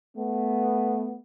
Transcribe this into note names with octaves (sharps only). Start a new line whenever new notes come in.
A3 B3